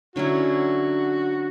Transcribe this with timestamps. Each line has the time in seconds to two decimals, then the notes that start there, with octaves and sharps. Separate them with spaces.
0.15 D3 F#3 C#4 E4 F#4